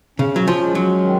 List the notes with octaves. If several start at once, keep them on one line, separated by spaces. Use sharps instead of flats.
C#3 C#4
F#3
F3
G#3
F#3
D#3